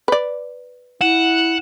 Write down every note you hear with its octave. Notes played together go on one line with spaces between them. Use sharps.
B4 D5
E4 F#5 E7